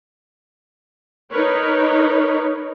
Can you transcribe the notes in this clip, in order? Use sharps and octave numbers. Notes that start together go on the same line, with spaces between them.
D#4 A#4 B4 C#5